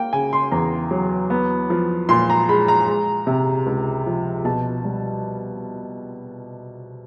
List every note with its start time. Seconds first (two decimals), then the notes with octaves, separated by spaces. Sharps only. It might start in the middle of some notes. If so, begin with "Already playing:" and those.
Already playing: A#3 G5
0.13 C#3 G#5
0.33 C6
0.52 E2 A#5
0.91 F#3
1.30 B3
1.70 F3
2.09 A#2 C6
2.30 A#5
2.49 G#3 B5
2.68 A#5
2.87 G#3
3.27 C3
3.66 C#2
4.06 F3
4.45 B2 A5
4.85 G3